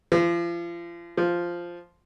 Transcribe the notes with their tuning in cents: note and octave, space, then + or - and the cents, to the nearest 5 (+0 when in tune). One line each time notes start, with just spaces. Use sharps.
F3 -35
F3 -5